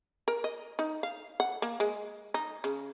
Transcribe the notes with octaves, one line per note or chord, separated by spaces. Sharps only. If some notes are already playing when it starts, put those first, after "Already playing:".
A#4
D#5
D#4
F5
F#5
A#3
G#3
D#4
C#3